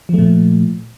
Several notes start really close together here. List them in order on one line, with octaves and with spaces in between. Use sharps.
F3 A3 A#2